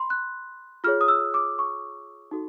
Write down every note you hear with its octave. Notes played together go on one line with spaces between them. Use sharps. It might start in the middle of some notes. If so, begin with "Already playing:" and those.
Already playing: B5 C6
F#6
F4 G#4 C#5 F6
D#6
E6
D6
C#6
D#4 F#4 A4